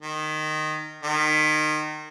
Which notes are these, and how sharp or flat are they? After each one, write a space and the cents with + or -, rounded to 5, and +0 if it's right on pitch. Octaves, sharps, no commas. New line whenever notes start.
D#3 -15
D#3 -25